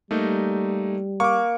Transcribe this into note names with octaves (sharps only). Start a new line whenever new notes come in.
G3 A3 A#3 D#4
A#3 C#6 D6